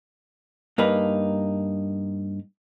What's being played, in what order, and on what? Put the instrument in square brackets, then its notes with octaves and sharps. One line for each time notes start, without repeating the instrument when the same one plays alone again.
[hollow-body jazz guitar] G2 A#3 D#4 B4